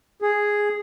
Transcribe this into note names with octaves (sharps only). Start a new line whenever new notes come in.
G#4